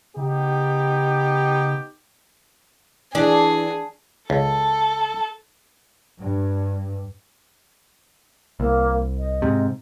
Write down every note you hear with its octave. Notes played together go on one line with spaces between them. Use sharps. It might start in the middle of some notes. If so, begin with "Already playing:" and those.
C#3 B3 D#4 G4
E3 D4 G#4
C#2 A4
G2
C2 A#3
D#5
G#2 C3